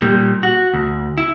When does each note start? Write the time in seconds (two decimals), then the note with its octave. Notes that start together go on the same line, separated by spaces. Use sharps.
0.02 A#2 G3
0.43 F#4
0.74 D2
1.18 E4